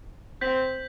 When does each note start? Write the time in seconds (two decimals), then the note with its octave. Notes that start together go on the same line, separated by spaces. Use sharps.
0.41 C4 G6 B6 F#7